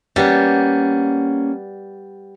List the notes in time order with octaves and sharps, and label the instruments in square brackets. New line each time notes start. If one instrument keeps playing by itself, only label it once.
[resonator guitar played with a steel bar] G3 B3 [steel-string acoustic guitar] A#3 C#4